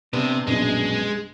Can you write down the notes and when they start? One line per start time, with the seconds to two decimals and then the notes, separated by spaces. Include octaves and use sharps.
0.13 C3 B3 D4
0.47 A#1 F#2 B2 G#3